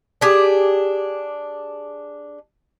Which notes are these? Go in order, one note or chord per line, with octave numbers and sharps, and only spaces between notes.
D4 G4 G#4